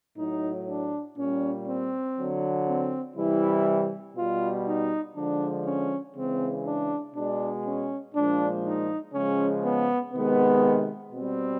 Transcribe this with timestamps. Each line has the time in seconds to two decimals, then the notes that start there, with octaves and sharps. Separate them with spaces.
0.18 A2 F#3 D#4
0.68 D4
1.18 A#2 G3 C#4
1.67 C4
2.17 D3 F#3
2.67 C4
3.17 C3 E3 G3 E4
4.16 B2 G3 F4
4.66 D#4
5.16 D3 F3 G#3 D4
5.66 C#4
6.15 C#3 E3 G#3 C4
6.65 D4
7.15 B2 G#3 D4
7.65 C#4
8.14 A#2 F3 G#3 D4
8.64 D#4
9.14 C#3 F3 G#3 C#4
9.64 B3
10.13 C3 D#3 G#3 B3
11.13 B2 G3 C4